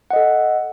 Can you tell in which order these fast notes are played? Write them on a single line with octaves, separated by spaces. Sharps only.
F#5 D#5 A4